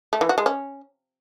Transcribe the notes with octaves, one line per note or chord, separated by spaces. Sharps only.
A3
E3
F#4
G#3
C#4